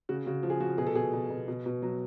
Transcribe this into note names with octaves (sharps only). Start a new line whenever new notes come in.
C#3 F#4
C#3 F#4
F3
G#4
F3 F#4
B2 G#4
A4
B2 G#4
B2
B2
B2
B2
F#3